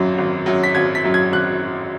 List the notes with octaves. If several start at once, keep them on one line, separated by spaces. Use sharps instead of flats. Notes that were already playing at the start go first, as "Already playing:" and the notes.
Already playing: G#1 F#2 F#3
G#1
F#2 F#3
B6
G#1 G#6
B6
F#2 F#3
G#6
G#1 F#6